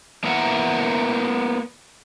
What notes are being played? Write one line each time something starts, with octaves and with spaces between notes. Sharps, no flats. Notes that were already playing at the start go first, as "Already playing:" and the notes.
A#3 B3 E4 A#4 E5 F#5